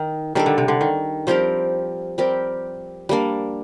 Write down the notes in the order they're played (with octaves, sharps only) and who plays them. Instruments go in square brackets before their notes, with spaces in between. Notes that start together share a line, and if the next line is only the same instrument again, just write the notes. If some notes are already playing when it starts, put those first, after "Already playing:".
Already playing: [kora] D#3
[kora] D#3 [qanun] G3 D4 A4
[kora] D3
C3
D3
D#3
[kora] F3 [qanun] G3 C4 G4 A#4
[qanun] G3 C4 G4 A#4
G3 A#3 D4